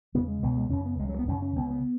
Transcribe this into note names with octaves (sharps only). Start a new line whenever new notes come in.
E2 C#3 B3
G#3
C#2 B2 B3
G#3
F#2 C#3 C#4
B3
C#2 C#3 G#3
F#3
B3
F#2 C#3 C#4
C#4
C#2 C#3 B3
B3